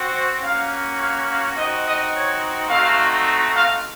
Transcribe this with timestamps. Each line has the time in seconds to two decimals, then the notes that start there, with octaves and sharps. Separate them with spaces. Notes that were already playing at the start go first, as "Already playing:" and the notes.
Already playing: C4 F#4
0.14 C5
0.43 A#3 C#4 F#4 F5
0.99 F5
1.28 F5
1.56 C4 D#4 F#4 D#5
1.84 D#5
2.12 C#5
2.69 A3 C4 D#4 F#4 F5
3.53 F5